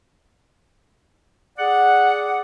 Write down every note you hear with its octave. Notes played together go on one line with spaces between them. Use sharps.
G#4 D5 F#5